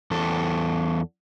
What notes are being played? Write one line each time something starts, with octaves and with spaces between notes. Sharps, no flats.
E2 A4